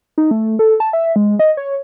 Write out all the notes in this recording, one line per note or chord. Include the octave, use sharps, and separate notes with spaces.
D#4
A3
A4
A5
E5
G#3
D#5
C#5